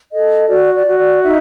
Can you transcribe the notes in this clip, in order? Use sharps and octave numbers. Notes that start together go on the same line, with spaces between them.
A4 D#5
F#4 D5
D5
F#4
D5
D#4 E5